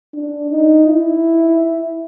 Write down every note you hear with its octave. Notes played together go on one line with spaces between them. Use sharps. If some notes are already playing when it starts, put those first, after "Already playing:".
D4
D#4
E4